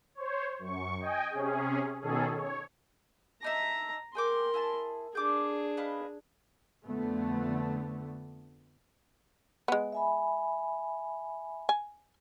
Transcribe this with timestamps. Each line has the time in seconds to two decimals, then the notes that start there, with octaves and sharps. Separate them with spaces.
0.15 C5 C#5
0.59 F#2 C#6
1.00 D#5 G5 G#5
1.30 C3 C#4 G#4
2.01 B2 D#3 C#4 G#4 A4
2.34 C#5
3.42 D4 D#4 E5 A#5
4.15 G#4 A#4 G5 C6 D6
4.54 E4 G#4 A5
5.15 D4 G#4 D5 D6 G6
5.77 B4 D#5 F5
6.86 F2 D3 A3 B3
9.68 G#3 B3
9.92 E5 G#5 B5
11.69 G#5